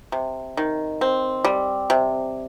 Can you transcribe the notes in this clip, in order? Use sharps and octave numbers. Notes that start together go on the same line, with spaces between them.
C3
D#3
C4
G3
C3